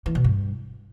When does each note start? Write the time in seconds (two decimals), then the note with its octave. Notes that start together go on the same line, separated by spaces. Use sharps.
0.06 E3
0.15 B2
0.24 G2